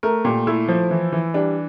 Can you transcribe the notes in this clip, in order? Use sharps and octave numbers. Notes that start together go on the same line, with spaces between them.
A3 A#4
A#2 G4
A3 E4
F3
E3
E3
G3 D4